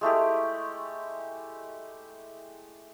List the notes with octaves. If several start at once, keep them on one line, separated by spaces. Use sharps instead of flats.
G#3 A3 E4 G4